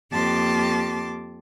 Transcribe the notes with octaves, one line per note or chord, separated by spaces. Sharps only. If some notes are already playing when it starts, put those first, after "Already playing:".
F2 A#3 G4 A5 C6 D6